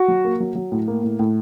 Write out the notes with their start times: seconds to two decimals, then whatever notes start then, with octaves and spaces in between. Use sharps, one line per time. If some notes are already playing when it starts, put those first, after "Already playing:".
Already playing: F#4
0.08 F#3
0.25 A#3
0.40 F#3
0.55 F#3
0.72 A2
0.88 A#3
1.04 A2
1.19 A2